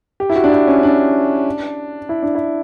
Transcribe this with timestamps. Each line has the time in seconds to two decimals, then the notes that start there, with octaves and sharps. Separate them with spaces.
0.20 G4
0.30 E4
0.36 F#4
0.44 D4
0.52 E4
0.67 C#4
0.83 D4
2.09 E4
2.23 D4
2.35 E4